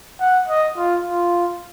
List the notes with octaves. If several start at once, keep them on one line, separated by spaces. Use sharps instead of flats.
F#5
D#5
F4
F4